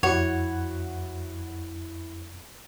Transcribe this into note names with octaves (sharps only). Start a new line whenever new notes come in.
F2 E4 F#4 C#5 F#5